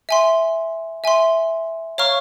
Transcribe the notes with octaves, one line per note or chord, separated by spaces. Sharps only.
E5 G#5 C6
E5 G#5 C6
C#5 F5 A#5 C#6 F6